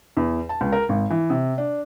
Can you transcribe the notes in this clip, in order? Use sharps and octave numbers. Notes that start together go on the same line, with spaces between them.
E2
A5
C#2
A#4
G#1
E3
C3
D4